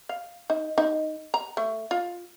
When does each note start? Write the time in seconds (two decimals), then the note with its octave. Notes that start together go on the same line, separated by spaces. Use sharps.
0.09 F5
0.50 D#4
0.78 D#4
1.34 A#5
1.57 A3
1.91 F4